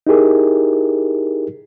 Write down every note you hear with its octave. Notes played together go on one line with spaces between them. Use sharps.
D#4 E4 G4 G#4 A#4